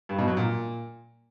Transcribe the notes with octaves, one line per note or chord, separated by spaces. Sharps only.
G2
B2
F#3
A#2